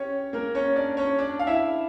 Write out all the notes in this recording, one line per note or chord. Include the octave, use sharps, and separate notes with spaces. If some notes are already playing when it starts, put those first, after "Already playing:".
Already playing: C#4 G4 C#5
A#3 A#4
C#4 C#5
D4 D5
C#4 C#5
D4 D5
F5
E4 E5